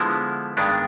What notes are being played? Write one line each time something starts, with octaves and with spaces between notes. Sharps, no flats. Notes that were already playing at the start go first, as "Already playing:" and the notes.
Already playing: D3 F3 G#3 B3 E4
G2 D#3 G#3 B3 D4